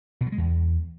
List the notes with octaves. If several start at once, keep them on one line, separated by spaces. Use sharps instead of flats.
B2
F#3
G#3
E2